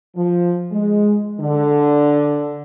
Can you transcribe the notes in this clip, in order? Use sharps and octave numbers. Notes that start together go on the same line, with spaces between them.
F3
G#3
D3